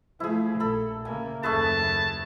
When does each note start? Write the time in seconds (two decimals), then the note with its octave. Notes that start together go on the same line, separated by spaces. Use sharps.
0.20 F3 A3 E4 G#4
0.60 A#1 A4 B5
1.05 C#3 A#3 G#5
1.43 F#1 D#2 A3 G#4 B4 A5